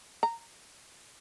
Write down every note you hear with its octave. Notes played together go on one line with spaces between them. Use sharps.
A#5